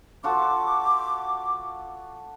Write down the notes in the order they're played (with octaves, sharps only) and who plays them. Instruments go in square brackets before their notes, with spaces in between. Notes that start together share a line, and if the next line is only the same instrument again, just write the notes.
[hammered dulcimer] F4 F#4 A4 [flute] D6